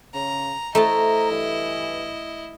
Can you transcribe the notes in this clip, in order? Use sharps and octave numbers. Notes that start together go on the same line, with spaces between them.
C#3 A#5
A3 E4 C5 D#5 A5 A#5
G2 E3